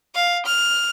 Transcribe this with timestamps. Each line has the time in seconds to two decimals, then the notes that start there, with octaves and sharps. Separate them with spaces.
0.15 F5
0.46 F6